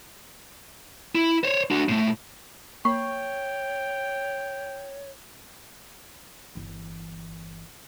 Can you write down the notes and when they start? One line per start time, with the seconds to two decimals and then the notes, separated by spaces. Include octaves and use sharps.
1.15 E4
1.44 C5 C#5
1.71 D4 F#4
1.89 A2 A3
2.85 A#3 C#5 G5 B5 C#6 C7
6.55 G1 E3